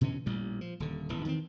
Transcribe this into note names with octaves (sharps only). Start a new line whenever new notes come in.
B2 D3 E3 C#4
A1 A#2 G3
F3
D#1 D3
D#1 E2 E3
D#3 E3 B3 C4